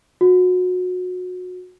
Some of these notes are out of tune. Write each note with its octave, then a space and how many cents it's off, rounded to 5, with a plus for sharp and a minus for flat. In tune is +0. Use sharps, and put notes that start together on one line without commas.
F#4 -25